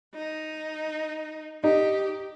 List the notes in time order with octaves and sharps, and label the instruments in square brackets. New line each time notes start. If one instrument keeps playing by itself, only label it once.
[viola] D#4
[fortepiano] D#4 [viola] G4